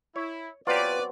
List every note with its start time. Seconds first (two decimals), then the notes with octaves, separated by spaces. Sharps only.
0.16 E4 C#5
0.67 F#3 B3 C4 F4 G4 B4 D5